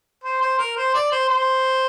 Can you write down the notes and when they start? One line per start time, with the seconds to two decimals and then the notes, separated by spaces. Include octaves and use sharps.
0.24 C5
0.41 C5
0.59 A#4
0.77 C5
0.94 D5
1.12 C5
1.29 C5